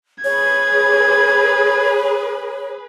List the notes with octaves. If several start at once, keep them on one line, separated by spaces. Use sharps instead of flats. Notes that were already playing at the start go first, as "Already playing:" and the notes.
G#4 B4 C#5 G#6